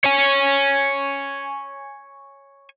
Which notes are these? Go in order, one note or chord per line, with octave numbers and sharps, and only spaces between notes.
C#5 G#5